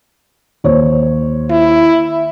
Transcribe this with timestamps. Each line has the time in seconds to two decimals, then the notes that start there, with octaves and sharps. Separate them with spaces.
0.64 D#2 C5 C#5
1.50 E4